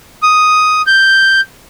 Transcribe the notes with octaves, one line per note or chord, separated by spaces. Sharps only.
D#6
G6